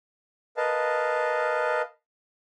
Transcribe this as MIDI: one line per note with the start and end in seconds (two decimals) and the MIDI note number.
0.57 1.82 70
0.57 1.82 71
0.57 1.82 75
0.57 1.82 77
0.57 1.82 81